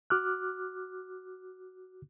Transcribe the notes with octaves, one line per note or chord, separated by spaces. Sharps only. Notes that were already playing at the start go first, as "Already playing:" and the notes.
F#4 D6 F6 F#6